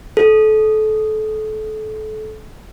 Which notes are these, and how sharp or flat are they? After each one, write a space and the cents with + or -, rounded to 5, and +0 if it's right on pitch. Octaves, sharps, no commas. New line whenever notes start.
A4 -25